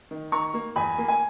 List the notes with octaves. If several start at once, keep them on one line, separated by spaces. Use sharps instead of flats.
D#3
D#3 A#5 C#6
A#3
E2 G#5 B5
A#3
G#5